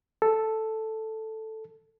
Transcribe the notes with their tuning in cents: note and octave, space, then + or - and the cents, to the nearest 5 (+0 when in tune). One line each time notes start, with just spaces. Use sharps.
A4 +0